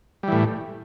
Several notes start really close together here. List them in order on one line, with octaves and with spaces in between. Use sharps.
G3 E3 A2